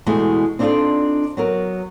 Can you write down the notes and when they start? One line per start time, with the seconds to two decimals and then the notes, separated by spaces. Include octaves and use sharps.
0.06 E2 B2 G#3 A3
0.59 C4 D4 D#4 F4 A4 D5
1.37 F#3 B3 A#4